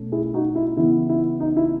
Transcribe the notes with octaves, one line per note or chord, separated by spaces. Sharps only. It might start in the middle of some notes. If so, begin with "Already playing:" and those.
Already playing: B2 A3 C#4
E4 G#4
D#4 F#4
E4
C#3 E3 B3 E4
E4
D#4
E4